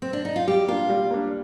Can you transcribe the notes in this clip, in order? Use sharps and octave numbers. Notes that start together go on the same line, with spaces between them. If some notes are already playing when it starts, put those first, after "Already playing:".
C4
D4
D#4
F4
G3 G4
A#3 D4 F4
G3
A#3 D4